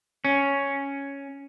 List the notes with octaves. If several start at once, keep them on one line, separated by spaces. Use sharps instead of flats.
C#4